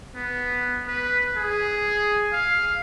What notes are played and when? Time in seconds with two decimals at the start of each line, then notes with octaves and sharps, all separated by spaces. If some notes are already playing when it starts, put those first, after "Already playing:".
0.14 B3
0.87 B4
1.37 G#4
2.33 F5